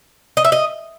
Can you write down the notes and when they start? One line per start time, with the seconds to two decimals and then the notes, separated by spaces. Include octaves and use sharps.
0.37 D#5
0.45 E5
0.52 D#5